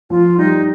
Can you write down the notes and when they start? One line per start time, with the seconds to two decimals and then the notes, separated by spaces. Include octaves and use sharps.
0.10 F3 F4
0.38 G3 D#4